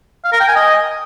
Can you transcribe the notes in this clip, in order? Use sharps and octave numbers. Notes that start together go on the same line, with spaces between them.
F5
A#4
G5
G#5
D#5